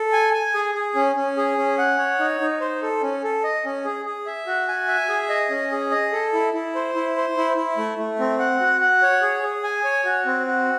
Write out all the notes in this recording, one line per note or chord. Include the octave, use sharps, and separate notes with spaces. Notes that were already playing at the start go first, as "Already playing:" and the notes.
Already playing: A4
G#5
G#5
G#4
G#4
C#4
C#4
G#4
C#4
F#5
C#5
D#4
D#4
C5
A4
C#4
A4
D#5
C#4
G#4
G#4
E5
F#4
G#5
E5
G#4
D#5
C#4
G#4
D#5
A4
E4
E4
C5
E4
C5
E4
E4
A3
A3
C4
F#5
F#4
F#5
C#5
G#4
G#4
G#5
C#5
F#4
C4
F#4